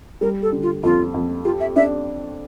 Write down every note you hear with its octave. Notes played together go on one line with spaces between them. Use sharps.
G3 A#4
A4
D3
F4
F2 F4
F2
F4 G4
E5
D4 E5